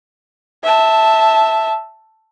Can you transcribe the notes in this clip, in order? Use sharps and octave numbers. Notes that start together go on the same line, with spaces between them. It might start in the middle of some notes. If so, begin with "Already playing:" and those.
E5 A5